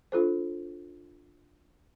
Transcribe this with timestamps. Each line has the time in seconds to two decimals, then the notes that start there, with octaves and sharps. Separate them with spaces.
0.12 D4 F4 A4 C5